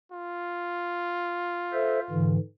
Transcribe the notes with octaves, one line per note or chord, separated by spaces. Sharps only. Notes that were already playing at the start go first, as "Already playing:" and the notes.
F4
A4 C5 E5
G#2 D3 E3